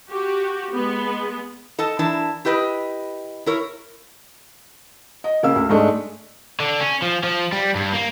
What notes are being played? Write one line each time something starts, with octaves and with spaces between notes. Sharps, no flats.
F#4 G4
G#3 B3
A4 D#5 A5
E3 D4 E4 A#4 A5
E4 G4 B4 D#5
E4 A#4 C#5
D#5
C#3 A#3 F5 E6
D2
G#2 G#3 A3 D4
D3
C#4
F3
F3
G3
G2
A#3